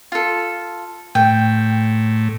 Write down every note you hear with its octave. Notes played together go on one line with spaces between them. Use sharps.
F4 A4
A2 G5